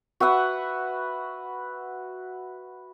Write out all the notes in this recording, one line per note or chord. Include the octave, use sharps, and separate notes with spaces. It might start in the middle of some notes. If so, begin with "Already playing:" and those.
F#4 B4 E5 F#5